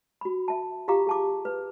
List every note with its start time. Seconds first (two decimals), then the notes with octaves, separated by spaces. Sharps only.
0.21 F#4 B5
0.48 E5 A5
0.88 F4 G4 F5 A#5 D6
1.07 G#4 A5 D6
1.45 B4